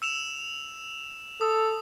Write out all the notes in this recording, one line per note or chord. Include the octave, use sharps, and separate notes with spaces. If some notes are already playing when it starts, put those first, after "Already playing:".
E6 E7 F7
A4 D#6